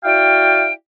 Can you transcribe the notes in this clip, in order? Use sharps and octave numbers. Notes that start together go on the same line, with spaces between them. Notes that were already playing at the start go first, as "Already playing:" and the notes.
E4 F#4 D5 F5 G5